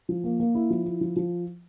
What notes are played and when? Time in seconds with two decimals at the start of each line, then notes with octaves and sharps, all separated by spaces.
0.09 F3
0.24 A#3
0.40 A#3
0.55 E4
0.70 F3
0.85 E4
1.01 F3
1.16 F3